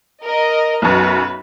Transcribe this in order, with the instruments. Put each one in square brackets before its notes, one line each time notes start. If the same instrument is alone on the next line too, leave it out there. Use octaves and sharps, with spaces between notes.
[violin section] A#4 D#5
[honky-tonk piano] B1 F#2 [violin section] B4